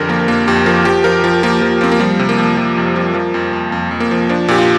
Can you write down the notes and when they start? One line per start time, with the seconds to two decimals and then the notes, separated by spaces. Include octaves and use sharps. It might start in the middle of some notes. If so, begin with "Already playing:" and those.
Already playing: F2 D3 G4 A#4
0.09 F3 A#3
0.28 F2 A#3
0.47 F2 G4
0.66 F3 A#4
0.85 F3 G4
1.04 F3 A#4
1.24 F3
1.43 F3 A#3
1.61 F3
1.81 F3 C4
1.92 A#3
2.00 F3 G3
2.19 C3
2.29 A#3
2.38 F3
2.57 F3
2.77 F2
2.96 F3
3.14 F3
3.34 F2
3.53 F2
3.72 F2
3.91 F2
4.00 A#3
4.11 F3
4.29 F3 D4
4.48 A#2 G4
4.58 F4